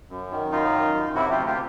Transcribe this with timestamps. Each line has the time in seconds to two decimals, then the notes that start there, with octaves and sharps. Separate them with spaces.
0.10 F#2
0.31 D#3
0.51 F#2 D#4 F4
0.72 D#3
0.94 F#2
1.15 C3 E4 F#4
1.30 F4 G4
1.36 D2
1.46 F4 G4